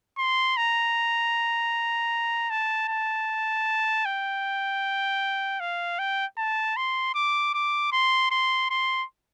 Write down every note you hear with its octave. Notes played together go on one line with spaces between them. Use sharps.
C6
A#5
A5
A5
G5
F5
G5
A5
C6
D6
D6
C6
C6
C6